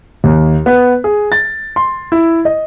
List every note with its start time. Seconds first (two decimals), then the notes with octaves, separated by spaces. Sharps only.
0.24 D#2
0.66 B3
1.04 G#4
1.32 A6
1.76 C6
2.12 E4
2.45 D#5